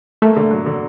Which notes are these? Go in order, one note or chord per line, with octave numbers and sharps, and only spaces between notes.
A3 A#3
D3
F#3
D3